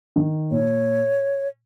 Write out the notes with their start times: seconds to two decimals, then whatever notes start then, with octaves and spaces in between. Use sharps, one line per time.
0.16 D#3
0.51 A#2 C#5